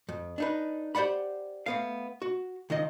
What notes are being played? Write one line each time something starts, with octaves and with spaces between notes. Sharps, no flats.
F2
D4 D#4 B4
G4 C5 D5 F#5 B5
A3 B3 F5
F#4
C#2 D#3 F3 D#5